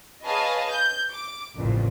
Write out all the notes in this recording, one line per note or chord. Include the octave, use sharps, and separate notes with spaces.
G#4 B4 C#5 D#5 F5 A5
G6
D6
A1 F2 A#2 C#3